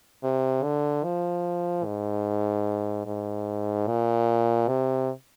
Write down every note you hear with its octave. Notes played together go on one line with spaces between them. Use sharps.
C3
D3
F3
G#2
G#2
A#2
C3